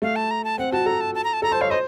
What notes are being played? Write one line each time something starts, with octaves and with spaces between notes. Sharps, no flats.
A3 F5
A5
A#5
A5
C4 F#5
F#4 A5
A4 A#5
A5
A5
A#5
A5
A4 A#5
C5 A5
C#5 F5
C5 D#5